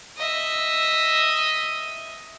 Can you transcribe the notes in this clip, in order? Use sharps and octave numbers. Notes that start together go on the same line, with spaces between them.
D#5 E5